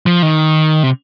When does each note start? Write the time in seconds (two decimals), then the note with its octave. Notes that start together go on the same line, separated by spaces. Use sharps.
0.06 F3
0.22 D#3
0.83 C3